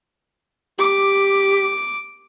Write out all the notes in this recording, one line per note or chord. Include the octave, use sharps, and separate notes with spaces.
G4 D6